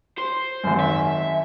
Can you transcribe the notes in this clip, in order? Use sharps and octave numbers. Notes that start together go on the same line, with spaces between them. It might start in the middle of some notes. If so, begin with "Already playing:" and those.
C5
G#1 F#2
E5